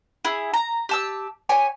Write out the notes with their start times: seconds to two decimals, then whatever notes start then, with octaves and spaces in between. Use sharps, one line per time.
0.25 E4 G#4
0.54 A#5
0.89 G4 A5 E6
1.49 G4 C#5 G#5